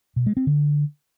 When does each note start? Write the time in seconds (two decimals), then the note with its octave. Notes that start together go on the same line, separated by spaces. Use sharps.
0.16 B2
0.26 G#3
0.37 C4
0.47 D3